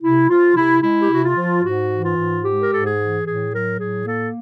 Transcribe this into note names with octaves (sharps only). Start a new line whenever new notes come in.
C3 E4
F3 F4
C3 E4
G#3 E4
G4
C3 F#4
F4
F3
G#2 F#4
E3
F4
G#2
G#3 G4
A#4
G#2 A4
G#4
E3
A2 G#4
F#3 A#4
A2 G#4
A#3 A4